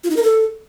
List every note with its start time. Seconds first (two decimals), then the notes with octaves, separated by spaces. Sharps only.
0.04 F4
0.10 D#4
0.16 A#4
0.23 A4